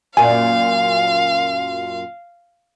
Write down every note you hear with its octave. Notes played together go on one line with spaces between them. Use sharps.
F#2 A#2 F5 G#5